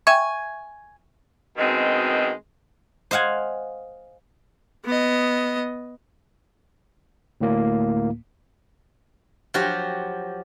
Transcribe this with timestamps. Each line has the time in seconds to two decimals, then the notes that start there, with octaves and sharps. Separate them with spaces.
0.07 E5 G#5 C#6
1.57 F#2 B2 D#3 G#3 C4
3.11 C5 D#5 F5 F#5 G#5
4.85 B3 D#5
7.41 D2 A2 A#3
9.54 F3 F#3 F#4 G4